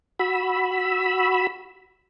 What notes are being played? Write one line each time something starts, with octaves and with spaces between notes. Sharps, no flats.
F#4 B5 E6